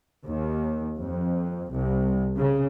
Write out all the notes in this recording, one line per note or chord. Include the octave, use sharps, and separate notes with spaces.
D#2
F2
C2
C#3